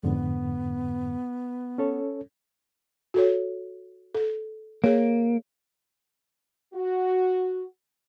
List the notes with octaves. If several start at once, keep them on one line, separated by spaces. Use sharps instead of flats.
F2 G#2 D3 B3
C#4 A4 C#5
F#4 A4 C#5
A4
A#3 G#4 C#5
F#4